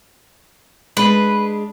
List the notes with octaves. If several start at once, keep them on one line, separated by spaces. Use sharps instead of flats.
G#3 D4 B4